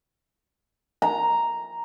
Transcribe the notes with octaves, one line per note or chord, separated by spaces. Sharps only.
A#5